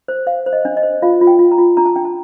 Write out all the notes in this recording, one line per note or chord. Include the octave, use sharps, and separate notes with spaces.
C5
C5 F5
C5
D#5
D4
D#5
C5
F4 F5
F4
G5
F4
A#5
F4
D4 A#5
A5
D4 G5
A5